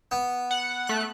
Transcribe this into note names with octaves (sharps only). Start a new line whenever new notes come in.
B3
F#5
A3 F#6